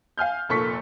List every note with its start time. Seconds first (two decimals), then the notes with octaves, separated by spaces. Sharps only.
0.18 F5 G#5 F6 G6
0.49 F1 A#2 A4 C#6 B6